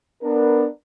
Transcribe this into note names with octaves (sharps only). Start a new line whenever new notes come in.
B3 D4 A#4